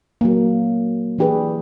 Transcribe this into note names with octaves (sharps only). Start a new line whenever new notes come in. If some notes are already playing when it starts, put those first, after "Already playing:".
F#3 A#3
E3 D4 G4 G#4 B4